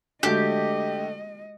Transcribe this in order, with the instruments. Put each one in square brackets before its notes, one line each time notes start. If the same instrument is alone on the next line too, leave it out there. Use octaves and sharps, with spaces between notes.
[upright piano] D3 A3 [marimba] G#3 F#4 [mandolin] G4 [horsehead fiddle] D#5